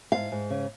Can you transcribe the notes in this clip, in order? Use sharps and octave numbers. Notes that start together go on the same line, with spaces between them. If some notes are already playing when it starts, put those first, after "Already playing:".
G#2 F5
G#2
C#3